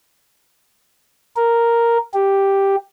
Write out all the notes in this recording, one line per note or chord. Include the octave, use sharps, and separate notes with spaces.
A#4
G4